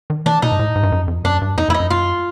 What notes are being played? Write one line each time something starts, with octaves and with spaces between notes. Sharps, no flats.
D#3
E3 D4
B2 D#4
G#2
A2
G#2
G2
F#2
F2
F#2 D4
G2
F2 D#4
F2 E4
D#4
F#2
F4